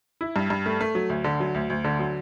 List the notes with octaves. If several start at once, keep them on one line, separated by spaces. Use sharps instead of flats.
E4
G2
G2
A3
A3
F#3
D2
D3
F#3
D2
D2
D3
F#3